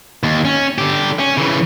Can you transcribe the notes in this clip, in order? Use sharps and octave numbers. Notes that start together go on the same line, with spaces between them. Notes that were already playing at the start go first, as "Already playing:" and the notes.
D#2
C#4
D3 G4
C#4
C#3 E3